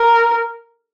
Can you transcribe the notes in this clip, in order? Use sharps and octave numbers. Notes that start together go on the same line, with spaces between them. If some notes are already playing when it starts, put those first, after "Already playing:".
Already playing: A#4